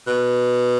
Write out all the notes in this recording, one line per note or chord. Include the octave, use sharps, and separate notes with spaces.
B2